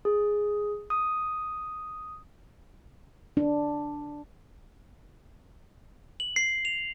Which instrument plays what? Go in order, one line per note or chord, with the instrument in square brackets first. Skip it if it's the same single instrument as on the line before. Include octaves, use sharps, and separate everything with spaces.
[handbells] G#4
D#6
[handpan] D4
[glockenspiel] F#7
C7
F7